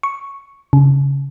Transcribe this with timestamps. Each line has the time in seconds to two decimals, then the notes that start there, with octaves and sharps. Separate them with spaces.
0.03 C#6
0.73 C#3